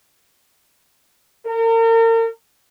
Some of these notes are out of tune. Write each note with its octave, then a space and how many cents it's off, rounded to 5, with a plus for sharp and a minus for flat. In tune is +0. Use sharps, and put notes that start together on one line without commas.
A#4 -40